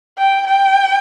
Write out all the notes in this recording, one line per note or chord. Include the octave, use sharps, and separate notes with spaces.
G5
G5